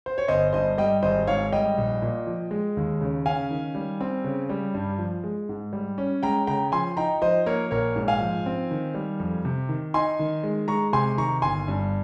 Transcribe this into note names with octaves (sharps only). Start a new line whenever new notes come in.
C5
C#5
G1 C5 D#5
G2 C5 D#5
G3 D#5 G5
G#1 C5 D#5
G#2 C#5 F5
G3 D#5 G5
A#1
A#2
F3
G#3
D#2
C#3
C#4 F5 G#5
D#3
G3
C4
C#3
G3
G2
F3
G#3
G#2
G3
C#4
G#3 G5 A#5
C#3 G5 A#5
F3 G#5 C6
D#4 G5 A#5
F3 C5 D#5
A#3 A#4 C#5
A#1 A#4 C#5
G#2
F5 G#5
F3
C4
D#3
G3
F2
C3
D#3
D#4 G#5 C6
D#3
G#3
G#3 A#5 C#6
C3 G#5 C6
D#3 A#5 C#6
G1 G#5 C6
G2